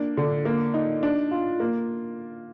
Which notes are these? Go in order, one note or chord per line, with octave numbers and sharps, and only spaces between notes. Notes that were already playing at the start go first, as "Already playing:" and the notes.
Already playing: A#3 D4
D3
A#3
D#4
D4
F4
A#3